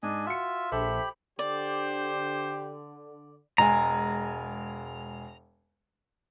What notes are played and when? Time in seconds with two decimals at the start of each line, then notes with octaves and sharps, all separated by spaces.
0.03 G#2 D4 D#5 G#5
0.26 F4 F#4 E5 C#7
0.72 A#1 G4 A4 C5 E5 B5
1.39 D3 G4 C5 D5
3.58 E1 G#3 G#5 A#5